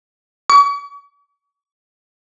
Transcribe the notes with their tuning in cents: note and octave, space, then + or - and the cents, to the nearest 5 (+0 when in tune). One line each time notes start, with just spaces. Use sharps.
C#6 +45